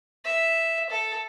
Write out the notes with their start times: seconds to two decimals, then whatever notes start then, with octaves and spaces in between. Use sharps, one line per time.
0.25 E5
0.90 A4